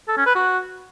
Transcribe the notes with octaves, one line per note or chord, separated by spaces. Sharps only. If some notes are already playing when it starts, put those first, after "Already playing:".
A4
C#4
B4
F#4